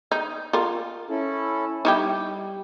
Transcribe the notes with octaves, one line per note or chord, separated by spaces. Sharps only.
D#4
F4 A#4
C#4 E4 A4
G3 D#4 E4 G4